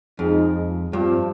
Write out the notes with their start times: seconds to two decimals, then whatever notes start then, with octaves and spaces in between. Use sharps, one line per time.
0.19 F2 F3 G#3 D#4 G#4
0.93 G2 F3 C4 F4